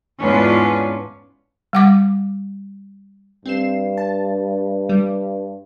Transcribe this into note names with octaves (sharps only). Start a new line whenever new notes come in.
E2 G#2 C#4 D4 F4 B4
G3 F#5 D6
G2 C4 C7 E7
A5
G3